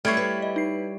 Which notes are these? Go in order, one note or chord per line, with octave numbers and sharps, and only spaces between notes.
G3 A3 E4 C#5 F6 G#6 C7
B4
D#5
D#4 C7